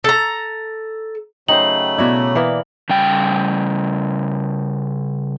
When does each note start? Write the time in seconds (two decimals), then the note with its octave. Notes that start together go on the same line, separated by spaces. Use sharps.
0.04 A4 A#5
1.48 C#3 F#3 A3 D#4 C5 G5 F#7
1.98 B2 E4 F#4 C#5 D5
2.35 E3 A#3 B3
2.90 C#3 G3 G5